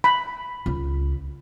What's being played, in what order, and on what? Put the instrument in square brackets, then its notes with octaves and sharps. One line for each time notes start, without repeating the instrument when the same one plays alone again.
[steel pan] B5
[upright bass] C#2